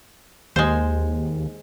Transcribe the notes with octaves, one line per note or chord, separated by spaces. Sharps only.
D#2 G#3 C5